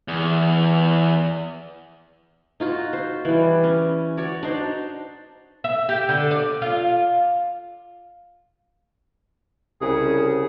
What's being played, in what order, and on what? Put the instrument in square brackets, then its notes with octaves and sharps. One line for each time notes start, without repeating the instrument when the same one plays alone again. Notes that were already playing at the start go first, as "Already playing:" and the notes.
[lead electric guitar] E2
[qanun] D#4 F4 F#4
C5
E3 G3
C#4
F#4 C#5 D5
D4 D#4 C5
[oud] E5
G4
D3
D5
F4
[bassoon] C2 [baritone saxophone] C#3 [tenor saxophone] G#4